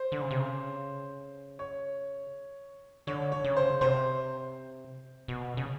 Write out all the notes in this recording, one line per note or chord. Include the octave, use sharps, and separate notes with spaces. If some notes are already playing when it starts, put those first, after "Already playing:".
Already playing: C5
D3
C#3
C3
C#3
C#5
D3 C#5
C#5
C#3
C5
C3 C5
B2
C#3